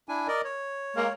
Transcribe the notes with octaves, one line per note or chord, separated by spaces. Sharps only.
D4 E4 G#5
A#4 D5 D#5
C#5
G#3 A#3